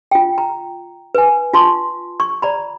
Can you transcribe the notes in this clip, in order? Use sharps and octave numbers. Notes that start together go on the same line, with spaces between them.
F4 G5
A#5
B4 G#5
F4 A5 C6 C#6
C#6
D5 A#5 B5